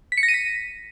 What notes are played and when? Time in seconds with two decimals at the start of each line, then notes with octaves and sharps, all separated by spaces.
0.12 B6
0.17 C#7
0.23 A#6
0.28 D#7
0.34 B6